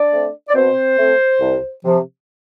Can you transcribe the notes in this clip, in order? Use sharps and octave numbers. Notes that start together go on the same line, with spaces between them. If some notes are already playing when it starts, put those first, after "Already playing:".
Already playing: D4 D5
A3 C4
D5
B2 C4 C5
A3 C4
C2
C3 F3